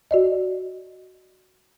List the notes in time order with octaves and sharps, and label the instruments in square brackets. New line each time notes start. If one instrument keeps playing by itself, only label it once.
[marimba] F#4 D5 D#5